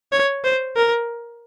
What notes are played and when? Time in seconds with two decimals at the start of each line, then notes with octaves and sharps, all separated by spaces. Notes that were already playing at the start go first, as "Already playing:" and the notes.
0.12 C#5
0.44 C5
0.76 A#4